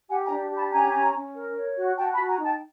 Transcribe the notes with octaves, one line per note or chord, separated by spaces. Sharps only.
G4 F#5 G#5
G#5 A#5
D4
G4
A5 B5
C#4 G#5 A#5
C#4
C#4
A#4
C#5
F#4
F#4 G5 A5
A5 B5
F#4
G#5 A#5
D#4
G5 A5